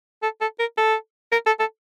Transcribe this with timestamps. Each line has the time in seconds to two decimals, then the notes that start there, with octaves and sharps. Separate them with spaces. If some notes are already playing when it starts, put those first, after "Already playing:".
0.23 A4
0.41 A4
0.59 A#4
0.78 A4
1.32 A#4
1.46 A4
1.60 A4